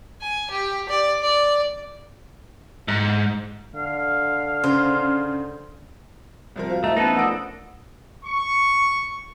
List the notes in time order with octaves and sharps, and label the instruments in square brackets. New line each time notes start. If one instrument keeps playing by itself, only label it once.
[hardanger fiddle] G#5
G4
D5
D5
[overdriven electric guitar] G#2
[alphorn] D3 [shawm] F5
[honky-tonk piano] C#3 [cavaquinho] C5
[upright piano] C2 F3 A#4
[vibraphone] F#4 C5 F5
[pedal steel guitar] A3 [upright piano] E4 A4 A#5 [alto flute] D#5
[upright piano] F#2 E3 B3 [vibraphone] A3 [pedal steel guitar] D#4 A4 B4 [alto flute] A5
[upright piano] F3 D4 D7 [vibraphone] A#4 D#6 E6 [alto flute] F#5
[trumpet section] C#6